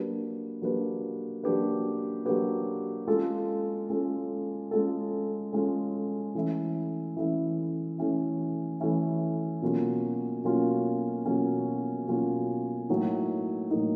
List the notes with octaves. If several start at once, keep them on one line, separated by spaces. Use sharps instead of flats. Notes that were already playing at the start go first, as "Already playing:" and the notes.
Already playing: F#3 A#3 D4 G4 B4
F#3 A#3 D4 G4 B4
F#3 A#3 D4 G4 B4
F#3 A#3 D4 G4 B4
G#3 C#4 F4 A4
G#3 C#4 F4 A4
G#3 C#4 F4 A4
G#3 C#4 F4 A4
E3 A3 C#4 E4
E3 A3 C#4 E4
E3 A3 C#4 E4
E3 A3 C#4 E4
B2 F#3 A#3 C#4 F4
B2 F#3 A#3 C#4 F4
B2 F#3 A#3 C#4 F4
B2 F#3 A#3 C#4 F4
A2 F#3 A#3 D#4
A2 F#3 A#3 D#4